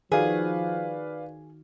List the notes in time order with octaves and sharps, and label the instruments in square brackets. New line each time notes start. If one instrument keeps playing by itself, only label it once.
[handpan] D#3 F#4 [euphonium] F3 [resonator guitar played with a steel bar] G#4 [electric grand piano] B4 D5 F5